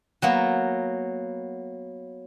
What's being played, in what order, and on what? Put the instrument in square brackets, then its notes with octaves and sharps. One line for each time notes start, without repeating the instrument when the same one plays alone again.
[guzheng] F#3 A#3 B3